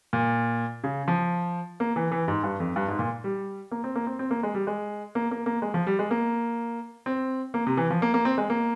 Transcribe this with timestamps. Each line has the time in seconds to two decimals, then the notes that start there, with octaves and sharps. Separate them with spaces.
0.13 A#2
0.84 C#3
1.08 F3
1.80 A#3
1.96 E3
2.11 E3
2.28 G#2
2.43 G2
2.60 F2
2.76 G2
2.88 G#2
2.99 A#2
3.24 G3
3.71 A#3
3.84 C4
3.95 A#3
4.07 C4
4.19 C4
4.31 A#3
4.43 G#3
4.54 G3
4.67 G#3
5.15 A#3
5.31 A#3
5.46 A#3
5.62 G#3
5.74 F3
5.87 G3
5.99 G#3
6.11 A#3
7.06 C4
7.54 A#3
7.67 C3
7.77 E3
7.90 F3
8.02 A#3
8.14 A#3
8.25 C4
8.38 G#3
8.50 A#3